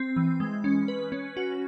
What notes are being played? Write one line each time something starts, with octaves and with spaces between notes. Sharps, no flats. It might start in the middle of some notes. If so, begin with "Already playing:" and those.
Already playing: C4
E3
G#3
C#4
B4
C#4
F#4